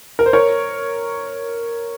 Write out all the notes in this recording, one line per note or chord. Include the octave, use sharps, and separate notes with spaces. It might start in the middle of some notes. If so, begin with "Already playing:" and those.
A#4
C5
A#4 C#5